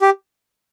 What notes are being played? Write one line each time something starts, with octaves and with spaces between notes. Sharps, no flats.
G4